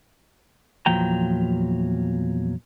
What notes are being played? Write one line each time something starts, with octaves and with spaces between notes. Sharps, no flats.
E2 A#2 F3 F#3 G5 A#5